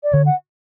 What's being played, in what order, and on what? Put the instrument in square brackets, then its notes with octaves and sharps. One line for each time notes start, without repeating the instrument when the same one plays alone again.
[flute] D5
[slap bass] D3 [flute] C#5
[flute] F#5